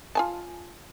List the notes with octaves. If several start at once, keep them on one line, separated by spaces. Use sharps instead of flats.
F4 G#5 A5